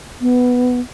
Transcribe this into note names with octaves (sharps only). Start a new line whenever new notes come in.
B3